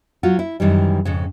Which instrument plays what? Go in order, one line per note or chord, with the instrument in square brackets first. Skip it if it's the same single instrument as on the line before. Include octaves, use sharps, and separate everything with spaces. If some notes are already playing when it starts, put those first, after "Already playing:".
[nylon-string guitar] F#3 F4 F#4
E4
F#2 D#3 E3 G3
F2 G#2 C#3